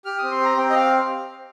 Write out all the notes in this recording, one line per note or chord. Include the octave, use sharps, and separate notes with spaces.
G4 F6
C4 D#6
C6
G4 A#5
C4 G5
D#5
G4 F5